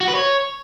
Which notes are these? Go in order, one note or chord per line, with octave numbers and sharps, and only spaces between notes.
F#4
B4
C#5